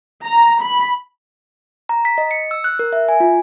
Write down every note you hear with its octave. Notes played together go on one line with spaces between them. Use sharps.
A#5
B5
A#5
B6
D#5
C#7
E6
F#6
A#4
E5
G#5
F4